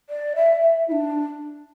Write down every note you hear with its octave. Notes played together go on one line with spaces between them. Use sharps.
D5
E5
E5
E4
D4